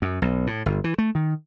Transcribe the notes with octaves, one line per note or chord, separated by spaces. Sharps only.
F#2
B1
A2
G1
E3
A3
D#3